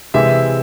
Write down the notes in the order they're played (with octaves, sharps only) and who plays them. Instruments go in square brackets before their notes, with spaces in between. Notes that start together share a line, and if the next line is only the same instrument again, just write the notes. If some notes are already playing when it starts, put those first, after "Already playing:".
[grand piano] C3 E3 G#3 E5